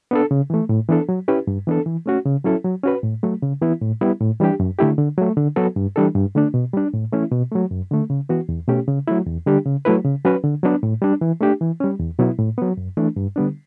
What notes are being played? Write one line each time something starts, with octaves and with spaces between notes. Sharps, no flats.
B3 D4 A4
C#3
E3 A3
A2
E3 B3 D4 A4
F#3
C#4 E4 G4 B4
G2
E3 B3 D4 A4
E3
A3 C#4 F#4
C#3
F#3 C#4 E4 A4
F#3
C#4 F#4 B4
A2
F#3 A3
C#3
E3 B3 E4
A2
G3 B3 E4
A2
E3 G3 D4 G4
F#2
D3 A3 E4 G4
D3
F#3 A3
D3
F#3 B3 F#4 A4
G2
E3 G3 D4 A4
G2
D3 A3 D4
B2
G3 D4
A2
E3 A3 C#4 E4
B2
F#3 A3
F#2
D3 A3
C#3
E3 B3 F#4
E2
B2 A3 C#4 G4
C#3
F#3 A3 E4
E2
D3 G3 D4 G4
C#3
F#3 A3 E4 B4
C#3
F#3 C#4 F#4 B4
D3
F#3 B3 D4
A2
G3 D4
E3
A3 D4 G4
E3
G3 C#4
E2
B2 F#3 B3 E4
A2
F#3 B3
F#2
E3 A3 D4
G2
D3 G3 B3 D4